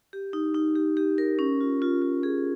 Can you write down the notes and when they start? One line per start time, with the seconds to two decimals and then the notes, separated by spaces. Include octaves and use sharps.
0.13 G4
0.33 D#4
0.54 D#4
0.75 G4
0.97 G4
1.18 A#4
1.39 C#4
1.61 F4
1.82 F4
2.02 F4
2.23 G#4